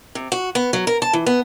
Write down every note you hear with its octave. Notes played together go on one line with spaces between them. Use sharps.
C3
F#4
B3
F#3
A#4
A5
E3
B3